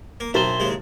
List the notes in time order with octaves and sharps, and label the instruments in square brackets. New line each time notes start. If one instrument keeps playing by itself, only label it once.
[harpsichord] A#3
[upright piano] B1 A#4 A6 [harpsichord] C4 [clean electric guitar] E4 C5
[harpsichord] D#2 C#3 G#3